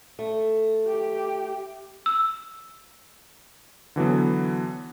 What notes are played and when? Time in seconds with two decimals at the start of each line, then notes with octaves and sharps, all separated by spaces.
0.19 A3
0.87 G4
2.06 E6
3.96 D3 E3 F#3 B3